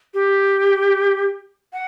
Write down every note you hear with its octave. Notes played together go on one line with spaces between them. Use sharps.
G4
F#5